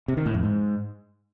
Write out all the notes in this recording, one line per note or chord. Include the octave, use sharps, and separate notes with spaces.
C3
D#3
A2
F2
G#2